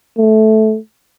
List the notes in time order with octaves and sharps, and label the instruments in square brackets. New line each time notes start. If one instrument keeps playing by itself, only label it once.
[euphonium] A3